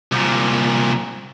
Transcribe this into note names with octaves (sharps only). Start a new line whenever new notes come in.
C2 A#2